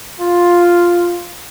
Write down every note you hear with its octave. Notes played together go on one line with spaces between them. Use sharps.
F4